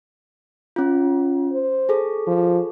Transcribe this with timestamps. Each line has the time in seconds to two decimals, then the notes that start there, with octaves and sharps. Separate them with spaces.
0.76 C#4 F4
1.53 C5
1.89 G#4 A4
2.27 F3